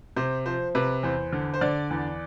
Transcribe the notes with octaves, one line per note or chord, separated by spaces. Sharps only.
C3 C5
F3 C5
C3 B4
E2 C5
D3
C5
D3 D5
E2